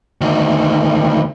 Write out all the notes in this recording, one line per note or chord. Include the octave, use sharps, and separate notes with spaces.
D2 D#3